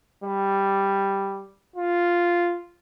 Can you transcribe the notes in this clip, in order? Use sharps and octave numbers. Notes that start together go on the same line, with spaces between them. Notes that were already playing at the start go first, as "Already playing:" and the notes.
G3
F4